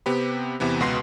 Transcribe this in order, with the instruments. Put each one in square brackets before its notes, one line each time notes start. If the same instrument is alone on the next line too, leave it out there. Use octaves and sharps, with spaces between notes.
[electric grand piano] C3 B3 C4 G4 B5
E2 C3 E3 B3
C#2 B2 F#4 B4 C6 C7